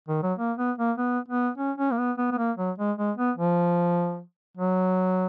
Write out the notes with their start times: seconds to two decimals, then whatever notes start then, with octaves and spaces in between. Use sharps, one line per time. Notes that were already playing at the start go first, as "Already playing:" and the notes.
0.08 D#3
0.23 F#3
0.38 A#3
0.58 B3
0.78 A#3
0.98 B3
1.28 B3
1.58 C#4
1.78 C#4
1.91 A#3
1.98 B3
2.18 B3
2.31 B3
2.38 A#3
2.57 F#3
2.78 G#3
2.98 G#3
3.17 B3
3.37 F3
4.57 F#3